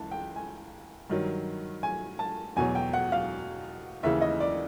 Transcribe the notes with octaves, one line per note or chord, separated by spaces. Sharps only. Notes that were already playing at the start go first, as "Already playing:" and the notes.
Already playing: C#2 C#3 E3 A5
G5
G#5
G2 D#3 F#3
G#5
A5
E2 B2 F#3 G#5
G5
F#5
F5
D#2 C#3 E3 E5
D#5
D5